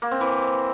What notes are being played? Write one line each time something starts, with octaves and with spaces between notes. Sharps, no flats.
A#3
C4
E3